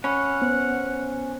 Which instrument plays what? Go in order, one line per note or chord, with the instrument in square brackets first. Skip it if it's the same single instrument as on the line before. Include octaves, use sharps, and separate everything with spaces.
[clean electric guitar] C#4 [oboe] F#5 [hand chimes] B5 C#6
[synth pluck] B3 [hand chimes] C5